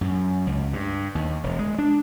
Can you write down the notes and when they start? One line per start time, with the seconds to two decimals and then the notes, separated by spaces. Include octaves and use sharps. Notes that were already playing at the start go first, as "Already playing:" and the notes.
0.01 F#2
0.47 C#2
0.73 G2
1.15 D#2
1.43 E1
1.59 G#3
1.79 D4